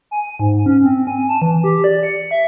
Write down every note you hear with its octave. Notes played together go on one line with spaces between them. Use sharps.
G#5
G#2
C#4
C4
G#5
A5
E3
G4
D5
C#7
E5